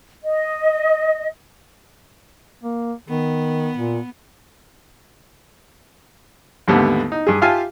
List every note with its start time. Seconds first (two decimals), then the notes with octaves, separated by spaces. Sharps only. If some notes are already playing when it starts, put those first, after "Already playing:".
0.24 D#5
2.64 A#3
3.09 D#3 B3
3.77 A#2
6.68 D#2 G#2 D3 G3 A3 B3
7.12 D#4
7.27 G2 G#4
7.42 F4 G4 E5 F5 G#5 A5